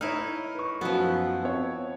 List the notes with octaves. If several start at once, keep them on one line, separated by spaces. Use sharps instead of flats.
D#4 E4 C#5 F6
B4 C#6
F#2 F3 F#3 B3
C4 C#5